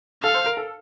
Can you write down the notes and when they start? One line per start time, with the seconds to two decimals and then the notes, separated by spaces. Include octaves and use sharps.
0.23 A4 F5
0.34 C5
0.46 A#4
0.57 A4